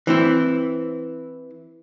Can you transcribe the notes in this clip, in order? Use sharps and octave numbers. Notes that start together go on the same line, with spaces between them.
E3 C4 E4